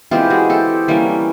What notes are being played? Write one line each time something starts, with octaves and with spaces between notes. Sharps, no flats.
E3 G#3 C4 F4 G4
F#4 G#4
G4 A4
E3 G3 A#3 C#4